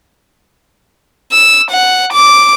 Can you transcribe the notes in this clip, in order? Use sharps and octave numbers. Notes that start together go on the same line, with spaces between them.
E6
F#5
D6